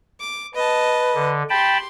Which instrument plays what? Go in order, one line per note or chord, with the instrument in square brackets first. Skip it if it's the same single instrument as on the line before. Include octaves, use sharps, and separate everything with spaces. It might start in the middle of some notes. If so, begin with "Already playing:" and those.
[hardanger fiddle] D6
[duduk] B4 [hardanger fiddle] D#5 A5
[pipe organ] D3
[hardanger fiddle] G4 C6 [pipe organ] G5 A5 B5